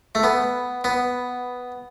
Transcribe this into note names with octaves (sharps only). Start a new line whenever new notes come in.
A3
B3
B3